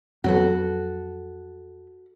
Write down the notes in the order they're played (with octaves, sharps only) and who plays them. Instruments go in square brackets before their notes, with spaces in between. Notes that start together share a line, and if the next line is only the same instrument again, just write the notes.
[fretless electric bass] F2 F#3 B3 [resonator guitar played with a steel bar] F#4 A4